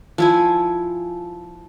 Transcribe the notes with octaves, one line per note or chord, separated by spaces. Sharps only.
F3 E4 G#5